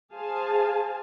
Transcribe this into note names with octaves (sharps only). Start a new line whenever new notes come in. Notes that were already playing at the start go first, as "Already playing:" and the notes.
G#4 C5 F5 G#5 A5